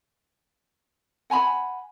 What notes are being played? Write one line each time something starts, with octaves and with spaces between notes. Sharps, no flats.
F#5 G#5 A#5 B5